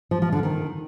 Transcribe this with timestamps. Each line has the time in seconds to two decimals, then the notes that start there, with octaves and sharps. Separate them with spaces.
0.11 F3
0.22 F3
0.32 D3
0.43 D#3